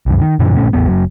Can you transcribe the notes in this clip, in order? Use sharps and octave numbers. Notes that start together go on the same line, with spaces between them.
C2 F#2
D#3
F#2 A#2 D3 F3
G1 A#2 A3 C#4
A1 E2 B3
F#1 F#3